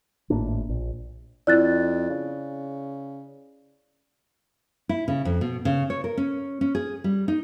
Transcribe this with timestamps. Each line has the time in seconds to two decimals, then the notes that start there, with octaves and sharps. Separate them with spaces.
0.30 G#1 A2 A#3 D4
0.69 A#1
1.47 F2 E4 D5 F#6 A6
2.10 C#3
4.89 E4
5.08 C#3
5.25 F2
5.41 B2
5.65 C#3
5.90 C#5
6.04 A#4
6.17 C#4
6.61 C#4
6.75 G#4
7.04 G3
7.28 D#4